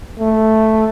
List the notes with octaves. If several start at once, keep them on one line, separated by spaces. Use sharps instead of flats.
A3